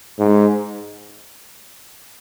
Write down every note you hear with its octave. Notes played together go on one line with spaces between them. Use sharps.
G#2